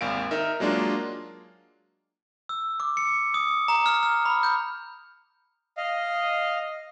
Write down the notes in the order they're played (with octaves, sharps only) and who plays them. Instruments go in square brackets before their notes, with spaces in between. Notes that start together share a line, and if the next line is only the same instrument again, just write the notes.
[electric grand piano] G#1 D#2 F5 D7
D#4 A#4 E5
F#3 G#3 A#3 D4 F4
[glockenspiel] E6
D6
C#7
D#6
A#5
F6
F6
B5
G6
[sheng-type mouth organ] D#5 F5